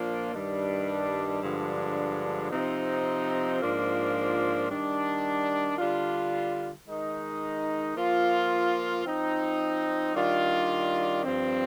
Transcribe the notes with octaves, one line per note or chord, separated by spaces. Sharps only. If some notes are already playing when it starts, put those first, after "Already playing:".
Already playing: A#2 F3 A#3 D4 F4
G2 D#3 G3 D4
G2 D3 F3 G#3 D4
C3 F3 C4 D#4
G#2 F3 A#3 D4 F4
D#3 G3 D4
D3 G3 D4 F4
D#3 G#3 D#4
F3 A#3 F4
F3 C4 D#4
D#3 G3 D4 F4
G2 F3 C4